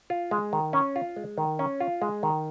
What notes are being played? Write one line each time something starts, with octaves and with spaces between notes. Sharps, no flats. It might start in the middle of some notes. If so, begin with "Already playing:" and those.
F4
G#3
D#3
C#4
F4
G#3
D#3
C#4
F4
G#3
D#3